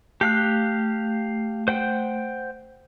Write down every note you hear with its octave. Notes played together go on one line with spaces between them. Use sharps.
A3 G4 F5 F#6
C5 F#5 G5